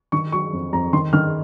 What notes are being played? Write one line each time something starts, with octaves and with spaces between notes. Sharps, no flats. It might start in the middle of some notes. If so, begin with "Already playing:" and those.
D#3 C#6
F#3 C#6
F2
F2 A#5
D#3 C6
D#3 F6